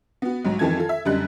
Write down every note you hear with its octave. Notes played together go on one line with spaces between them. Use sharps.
B3 F#4
B1 G#2 F#3
F2 D#3 E3 A4 A5 G#6
F4 A4
E5
F#2 D3 G3 D#5 F#6